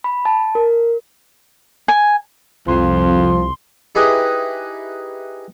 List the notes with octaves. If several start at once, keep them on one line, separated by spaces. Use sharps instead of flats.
B5
A5
A#4
G#5
C2 F2 F3 C6
D#4 E4 G4 G#4 B4 D#5